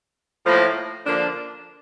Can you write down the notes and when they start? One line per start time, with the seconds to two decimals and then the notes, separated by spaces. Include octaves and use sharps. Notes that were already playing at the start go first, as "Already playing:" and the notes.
0.45 A2 F3 A#3
1.05 D3 F3 A#3 D4 F4